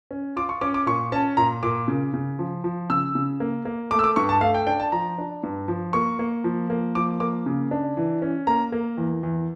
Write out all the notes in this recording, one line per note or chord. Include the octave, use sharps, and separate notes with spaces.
C#4
F4 D6
C#6
C#4 D6
D6
A#2 C#6
C#4 A5
A#2 A#5
A#2 D6
C#3
C#3
F3
F3
C#3 E6
C#3
A#3
A#3
A3 D6
E6
D6
G2 C#6
A5
A3 F5
G5
D4 G5
A5
F3 A#5
D4
G2
F3
A#3 C#6
A#3
F3
A#3
F3 D6
A#3 D6
C#3
D4
E3
C#4
A#3 A#5
A#3
E2
E2